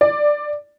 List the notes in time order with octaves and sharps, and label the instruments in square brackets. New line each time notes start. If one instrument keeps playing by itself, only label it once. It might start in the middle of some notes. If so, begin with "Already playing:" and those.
[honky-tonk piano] D5